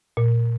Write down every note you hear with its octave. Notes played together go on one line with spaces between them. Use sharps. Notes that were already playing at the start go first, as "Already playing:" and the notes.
A#2